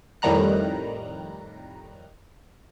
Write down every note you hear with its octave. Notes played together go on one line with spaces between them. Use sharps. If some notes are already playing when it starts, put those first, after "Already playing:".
F2 A2 D#3 G3 A#5 F#6